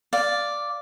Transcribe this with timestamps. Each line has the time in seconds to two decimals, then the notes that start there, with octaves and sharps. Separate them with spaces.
0.13 D5 F5